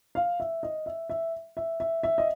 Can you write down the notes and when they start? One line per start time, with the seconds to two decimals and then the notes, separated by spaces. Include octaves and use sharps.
0.15 F5
0.40 E5
0.63 D#5
0.86 E5
1.10 E5
1.57 E5
1.80 E5
2.03 E5
2.18 D#5